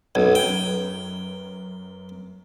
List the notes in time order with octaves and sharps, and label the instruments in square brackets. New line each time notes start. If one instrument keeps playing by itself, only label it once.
[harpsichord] B1 [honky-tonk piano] F#2 B4 G#6
[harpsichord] G5